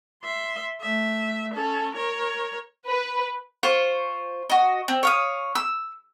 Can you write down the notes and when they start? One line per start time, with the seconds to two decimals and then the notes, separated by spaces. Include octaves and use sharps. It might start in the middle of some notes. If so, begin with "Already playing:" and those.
0.24 E5 C6
0.81 A3 E5
1.54 C#4 A4
1.95 A#4 C#5
2.88 B4
3.63 F4 C5 C#6
4.50 F#4 D#5
4.88 C4
5.03 C#5 F5 D#6
5.55 E6